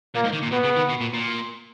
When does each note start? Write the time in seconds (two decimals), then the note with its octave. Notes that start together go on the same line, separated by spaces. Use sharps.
0.15 A#2 A#3
0.24 G#2
0.33 D#3
0.43 A#2
0.51 B2 B3
0.64 C#3
0.77 D#3
0.89 B2
1.01 A#2
1.13 A#2